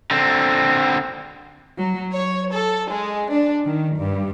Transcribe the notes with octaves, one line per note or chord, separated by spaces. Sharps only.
D3 C4
F#3
C#5
A4
G#3
D4
D#3
G2